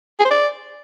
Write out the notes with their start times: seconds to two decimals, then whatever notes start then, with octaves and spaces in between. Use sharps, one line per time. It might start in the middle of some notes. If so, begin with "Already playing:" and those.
0.19 G#4
0.25 C5
0.31 D5